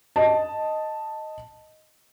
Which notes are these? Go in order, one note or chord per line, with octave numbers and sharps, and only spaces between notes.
D#5 A5